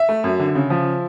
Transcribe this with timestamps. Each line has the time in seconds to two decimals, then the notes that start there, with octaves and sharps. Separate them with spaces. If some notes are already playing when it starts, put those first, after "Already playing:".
Already playing: E5
0.09 A3
0.24 F#2
0.39 D3
0.55 C#3
0.70 F3